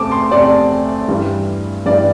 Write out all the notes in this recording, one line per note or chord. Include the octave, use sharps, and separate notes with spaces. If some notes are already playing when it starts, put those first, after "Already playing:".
Already playing: E2 C3 A3 C4 A5 D6
C6
E2 C3 A3 C4 D5
G2 E3 G3
G2 E3 G3 D5